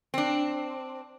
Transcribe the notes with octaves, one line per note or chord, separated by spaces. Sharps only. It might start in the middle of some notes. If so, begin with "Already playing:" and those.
C4 D4